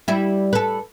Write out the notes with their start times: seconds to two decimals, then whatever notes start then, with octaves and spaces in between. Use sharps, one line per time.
0.08 G3 E4
0.53 A4 B4